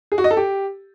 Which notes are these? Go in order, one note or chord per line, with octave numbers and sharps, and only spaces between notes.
G#4
F#4
D#5
A4
G4